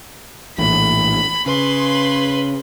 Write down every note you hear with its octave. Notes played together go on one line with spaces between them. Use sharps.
A#1 A2 E3 B5
C#3 B4 C6